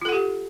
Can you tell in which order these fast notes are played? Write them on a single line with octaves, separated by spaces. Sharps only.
F4 A4 F#5 G4